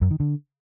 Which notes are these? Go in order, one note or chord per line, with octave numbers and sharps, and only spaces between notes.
F#2
D#3
D3